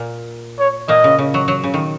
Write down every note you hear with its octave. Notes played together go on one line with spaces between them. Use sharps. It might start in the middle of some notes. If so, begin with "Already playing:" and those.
Already playing: A#2 A#3
C#5
A#2 A#3 D#5
C#3
C#3
F#3
F#3
C#3
D#3